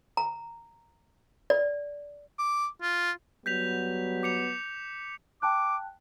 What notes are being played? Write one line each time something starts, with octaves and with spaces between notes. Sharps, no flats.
A#5
D5
D6
F4
F#3 G3 B3 G6 B6 F7
D6 C#7 F7
G5 A5 D6 F#6